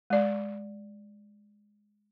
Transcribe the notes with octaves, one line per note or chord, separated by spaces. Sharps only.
G#3 D5